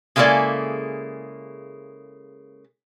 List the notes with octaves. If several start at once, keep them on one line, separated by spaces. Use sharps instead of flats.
C#3 G#3 A#3 E4 A4 D5